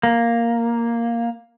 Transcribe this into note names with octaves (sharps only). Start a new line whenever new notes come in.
A#3